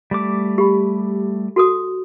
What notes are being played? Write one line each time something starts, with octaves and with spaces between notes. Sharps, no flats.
G3 A3 D6
G4 B5
F#4 A4 D#6